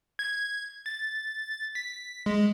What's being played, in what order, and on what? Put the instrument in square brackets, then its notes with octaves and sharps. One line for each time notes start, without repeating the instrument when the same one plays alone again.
[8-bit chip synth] G#6
A6
B6
G#3